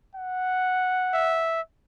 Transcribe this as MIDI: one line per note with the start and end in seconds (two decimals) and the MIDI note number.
0.15 1.52 78
1.13 1.61 76